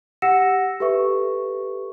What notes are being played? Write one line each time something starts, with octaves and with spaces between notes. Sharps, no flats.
G4 F#5 E6 A#6 C#7 E7
G4 A4 B4 E5 C#6